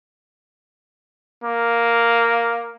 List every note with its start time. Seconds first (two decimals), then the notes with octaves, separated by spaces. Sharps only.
1.44 A#3